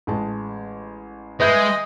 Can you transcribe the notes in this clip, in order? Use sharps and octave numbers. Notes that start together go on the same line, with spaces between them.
A1 G#3 A5
G#3 B4 D#5 E5 G6